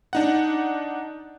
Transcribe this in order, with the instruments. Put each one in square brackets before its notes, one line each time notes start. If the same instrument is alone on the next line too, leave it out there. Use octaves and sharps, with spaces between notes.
[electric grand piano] D4 D#4 F#5